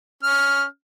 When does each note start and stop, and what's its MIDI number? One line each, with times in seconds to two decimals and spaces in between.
0.23 0.64 61
0.23 0.64 89